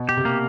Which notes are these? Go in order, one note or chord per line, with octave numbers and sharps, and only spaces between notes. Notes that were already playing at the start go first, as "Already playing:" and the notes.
Already playing: B2
G4
C3
A#3